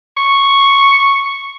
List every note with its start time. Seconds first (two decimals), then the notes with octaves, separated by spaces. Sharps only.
0.17 C#6